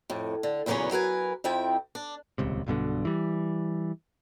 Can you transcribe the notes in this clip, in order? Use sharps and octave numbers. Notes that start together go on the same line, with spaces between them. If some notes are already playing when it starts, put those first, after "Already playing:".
F2 A2
D3
E2 A#2 C#3 F#3 B3 C#4
F#3 A#4 B4 G#5
F2 F3 C4 E4 G5
D4
D#1 C#2 C3
B1 G2 B2 D3
E3 G3